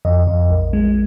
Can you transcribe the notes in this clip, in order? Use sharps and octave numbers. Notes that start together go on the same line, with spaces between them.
F2 D#5
F2
A#1
G#3